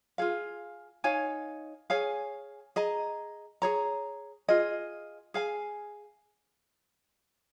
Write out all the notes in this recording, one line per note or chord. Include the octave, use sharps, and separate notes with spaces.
F4 G#4 F5
D#4 C#5 F5 G#5
G#4 C#5 F5 G#5
G#4 D#5 A#5
G#4 C#5 A#5
F4 G#4 D#5
G#4 F5 G#5